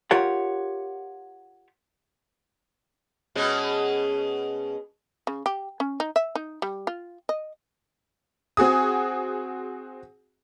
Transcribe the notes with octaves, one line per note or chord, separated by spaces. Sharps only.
F4 G4 A#4 C#5 F#5
B2 G#3 C#4
C#3
G4
C#4
D#4
E5
D#4
G3
F4
D#5
C4 F#4 G#4 D#6